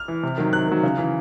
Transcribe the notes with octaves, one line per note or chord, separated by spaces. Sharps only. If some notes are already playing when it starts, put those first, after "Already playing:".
Already playing: F6
E3
C3
D#3 F#3
C3 F#6
D#3 F#3
C#3
E3